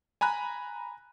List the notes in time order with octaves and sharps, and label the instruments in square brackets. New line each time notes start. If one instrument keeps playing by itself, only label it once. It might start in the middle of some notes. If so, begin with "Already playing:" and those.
[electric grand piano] G#5 A#5 B5 F#6